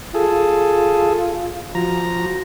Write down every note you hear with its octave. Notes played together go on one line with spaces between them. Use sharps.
F4 G#4 A4
F3 F#4 A#5